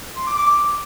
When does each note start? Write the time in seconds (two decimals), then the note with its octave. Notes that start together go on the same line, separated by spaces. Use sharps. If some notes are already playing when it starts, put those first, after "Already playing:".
0.16 C6
0.27 D6
0.37 D6